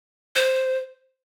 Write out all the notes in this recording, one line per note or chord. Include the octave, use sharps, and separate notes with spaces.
C5